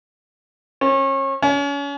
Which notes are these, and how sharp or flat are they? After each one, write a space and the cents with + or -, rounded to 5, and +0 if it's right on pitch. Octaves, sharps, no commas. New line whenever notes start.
C#4 -35
C#4 +35